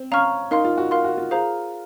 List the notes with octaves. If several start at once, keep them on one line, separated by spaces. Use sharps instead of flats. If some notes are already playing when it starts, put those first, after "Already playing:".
Already playing: C4
C#4 F5 A#5 C#6 F6
D#4 A#4 F5 C6
F4
F#4
A#4 F5 C6
F#4
F4
G#4 C5 F5 A#5